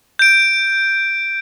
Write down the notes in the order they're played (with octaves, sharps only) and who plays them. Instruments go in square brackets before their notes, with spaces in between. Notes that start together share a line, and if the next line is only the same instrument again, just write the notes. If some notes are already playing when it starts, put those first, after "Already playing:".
[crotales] G6 D7